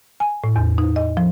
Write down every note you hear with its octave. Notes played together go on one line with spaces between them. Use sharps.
G#5
A2
E2
D#4
D#5
F3